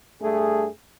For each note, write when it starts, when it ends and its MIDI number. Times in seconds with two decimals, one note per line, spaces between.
0.21 0.68 43
0.21 0.68 57
0.21 0.68 68